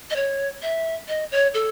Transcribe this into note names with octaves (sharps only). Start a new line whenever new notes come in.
D#5
C#5
E5
D#5
C#5
A4